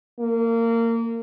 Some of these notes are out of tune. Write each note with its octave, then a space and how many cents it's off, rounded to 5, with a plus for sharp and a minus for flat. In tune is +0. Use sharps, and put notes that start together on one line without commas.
A#3 -25